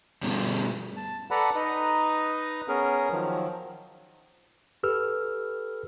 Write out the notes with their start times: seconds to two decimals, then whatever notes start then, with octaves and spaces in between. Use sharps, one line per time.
0.23 G2 B2
0.96 A5
1.31 A4 B4 D5 F#5 A#5 B5
1.55 D#4 B4 D#5 A#5
2.68 B3 C#4 G#4 A#4
3.12 D#3 F3 F#3
4.83 G4 A4 B4 E6 F6